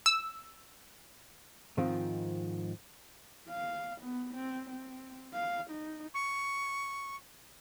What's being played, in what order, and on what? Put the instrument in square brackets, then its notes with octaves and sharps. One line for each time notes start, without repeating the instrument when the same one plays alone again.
[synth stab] E6
[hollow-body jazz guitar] G#2 D#3 F3 G#3 C4 F4
[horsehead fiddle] F5
B3
C4
C4
F5
D#4
[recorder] C#6